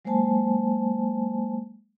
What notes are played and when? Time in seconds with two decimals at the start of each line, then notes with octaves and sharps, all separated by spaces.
0.05 F#3 G#3 A#3 C5 G#5 A5